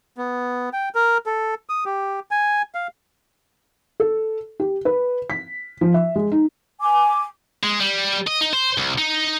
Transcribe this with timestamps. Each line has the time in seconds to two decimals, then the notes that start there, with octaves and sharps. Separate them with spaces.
0.17 B3
0.73 G5
0.95 A#4
1.26 A4
1.69 D#6
1.85 G4
2.31 G#5
2.75 F5
4.00 A4
4.60 G4
4.85 B4
5.30 B6
5.81 F3
5.94 E5
6.16 G#3
6.32 D#4
6.81 G#5 D6
7.64 G#3
7.80 G3
8.27 D#5
8.41 D#4
8.53 C5
8.78 C2
8.98 D#4